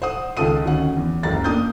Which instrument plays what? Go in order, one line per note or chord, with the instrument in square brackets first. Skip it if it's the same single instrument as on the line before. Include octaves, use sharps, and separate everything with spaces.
[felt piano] C5 F#5 D#6
C#2 D#3 F4 A4 D#6 D#7
D2 D#3 C#4 F#5
E2
F#1 C#2 A#5 A6
A#3 D4 D#6 G6